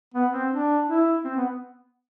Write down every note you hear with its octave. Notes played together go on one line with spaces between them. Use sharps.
B3
C4
D4
E4
C4
B3